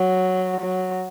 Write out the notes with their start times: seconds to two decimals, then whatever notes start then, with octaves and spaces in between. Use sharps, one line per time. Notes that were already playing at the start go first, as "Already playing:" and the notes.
Already playing: F#3
0.61 F#3